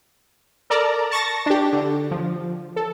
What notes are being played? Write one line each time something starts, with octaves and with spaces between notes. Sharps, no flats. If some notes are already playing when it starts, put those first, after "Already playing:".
A4 A#4 D5 A5 A#5
A5 C#6 A6 A#6
D4 G4
D3
F3
A4